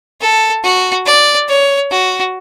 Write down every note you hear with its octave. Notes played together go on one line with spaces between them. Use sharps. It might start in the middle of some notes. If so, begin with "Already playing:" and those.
A4
F#4
D5
C#5
F#4